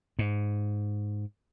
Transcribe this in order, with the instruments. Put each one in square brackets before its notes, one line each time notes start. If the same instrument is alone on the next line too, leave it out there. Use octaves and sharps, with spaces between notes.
[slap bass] G#2